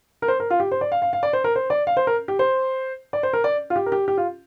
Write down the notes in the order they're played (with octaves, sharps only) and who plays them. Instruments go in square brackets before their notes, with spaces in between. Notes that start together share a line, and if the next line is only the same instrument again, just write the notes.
[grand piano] A#4
C5
A#4
F4
G4
C5
D5
F5
F5
F5
D5
C5
A#4
C5
D5
F5
C5
A#4
G4
C5
D5
C5
A#4
D5
F4
G4
A#4
G4
G4
F4